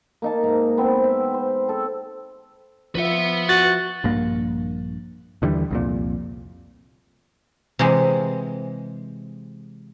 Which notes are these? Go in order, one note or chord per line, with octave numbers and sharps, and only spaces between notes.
A#3 D#4 A5
G#2 E5 A#5
B3 C4
E5
C5
A4
F3 F4 B4 E5 F#5
F#4 A6
A#1 G2 A#3
D#2 D3 E3 G3
C2 F2 A#2
C3 E3 G#3